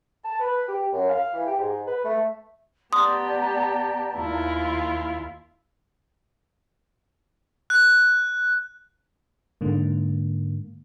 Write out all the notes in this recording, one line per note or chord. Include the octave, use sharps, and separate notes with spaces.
A5
B4
G4
F#2
F5
E3
G4
G#2
B4
A3
B3 G4 D5 A5 A#5 C6 D#6
D#2 E4 F4
F#6
G#2 D3 A#3